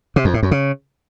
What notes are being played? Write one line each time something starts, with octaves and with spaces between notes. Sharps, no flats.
C3
F2
A2
F#2
C#3